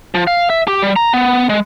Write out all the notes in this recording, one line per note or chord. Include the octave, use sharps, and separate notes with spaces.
F3
F5
E5
G4
G3
A#5
B3
G#3